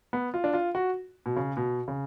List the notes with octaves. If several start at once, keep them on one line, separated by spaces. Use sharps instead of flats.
B3
F4
D4
F4
F#4
B2
C#3
B2
C#3